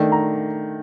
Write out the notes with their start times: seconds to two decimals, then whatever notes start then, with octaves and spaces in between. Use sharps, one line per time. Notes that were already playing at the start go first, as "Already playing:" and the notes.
Already playing: D#3 A3 D4
0.12 A#5